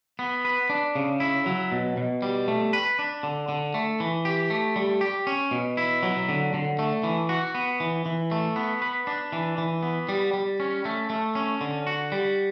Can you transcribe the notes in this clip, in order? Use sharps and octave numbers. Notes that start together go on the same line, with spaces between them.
B3
B4
D4
C#3
E4
F#3
B2
B2
G3
A3
B4
D4
D3
D3
A3
E3
G4
A3
G3
G4
C#4
B2
E4
F#3
D3
D3
A3
E3
F#4
B3
E3
E3
A3
B3
B4
D4
E3
E3
B3
G3
G3
C#4
A3
A3
C#4
D3
F#4
G3